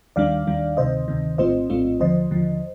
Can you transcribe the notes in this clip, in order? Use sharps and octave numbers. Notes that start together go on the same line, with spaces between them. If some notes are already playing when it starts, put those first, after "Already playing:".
D#2 D#3 G3 D4 D5 F5
D#2 D#3 G3 D4
D2 C3 D#3 C5 D#5
D2 C3 D#3
A#1 A2 A3 C4 F4 C5 D#5
A#1 A2 A3 C4 F4
D#2 D3 F3 C5 D#5
D#2 D3 F3